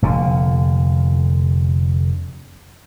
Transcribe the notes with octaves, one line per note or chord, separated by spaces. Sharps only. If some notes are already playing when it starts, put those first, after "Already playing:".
F1 A#2 D3